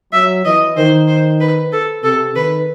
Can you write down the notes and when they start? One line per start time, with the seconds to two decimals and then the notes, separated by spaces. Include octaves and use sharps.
0.12 F#3 E5
0.44 E3 D#5
0.77 D#3 C5
1.08 C5
1.40 B4
1.72 A4
2.03 C3 A4
2.35 D#3 B4